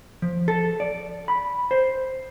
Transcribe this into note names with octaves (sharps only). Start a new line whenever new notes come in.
F3
A4
D5
B5
C5